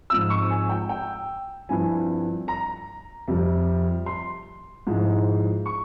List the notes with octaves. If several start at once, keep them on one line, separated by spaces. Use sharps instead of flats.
G#2 F3 C4 F4 E6
C#6
G#5
G5
G5
G2 F3 C4 E4 G#5
A#5
F2 C3 G3
C6
G#2 F3 G#3 E4
C#6